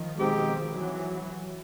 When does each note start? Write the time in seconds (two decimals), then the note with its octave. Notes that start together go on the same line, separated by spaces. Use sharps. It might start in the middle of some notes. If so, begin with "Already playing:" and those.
Already playing: D#3 F3
0.17 B2 G#3 C4 D#4 G4
0.72 E3 F#3